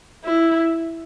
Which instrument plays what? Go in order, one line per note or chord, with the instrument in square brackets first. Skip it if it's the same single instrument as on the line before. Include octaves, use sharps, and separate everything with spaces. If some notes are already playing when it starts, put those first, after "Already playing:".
[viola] E4